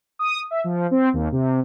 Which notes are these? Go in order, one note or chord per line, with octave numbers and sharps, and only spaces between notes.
D#6
E5
F3
C4
D#2
C3